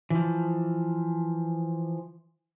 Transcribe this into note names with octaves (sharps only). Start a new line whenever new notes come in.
E3 F3